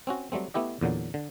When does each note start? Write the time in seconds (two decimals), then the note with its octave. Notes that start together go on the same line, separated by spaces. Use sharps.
0.07 C4 C#4 F#4
0.32 F#3 G3 A3 C4
0.54 A3 B3 E4 G4 D#5
0.81 E2 A#2 D3 F#3
1.14 D3